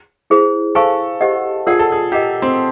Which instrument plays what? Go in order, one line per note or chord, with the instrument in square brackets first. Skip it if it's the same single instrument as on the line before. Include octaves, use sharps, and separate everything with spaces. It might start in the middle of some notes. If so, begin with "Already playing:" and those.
[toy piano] E4 G#4 C5
[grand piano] A4 [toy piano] C5 F5 G#5 C#6
[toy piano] G4 C5 D#5 F#5
[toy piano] F4 A#4 D5 F#5 A5 [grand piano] G#4
[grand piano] A4
G#4
[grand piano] G4 [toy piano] A#4 D#5 F#5 A#5
[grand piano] C4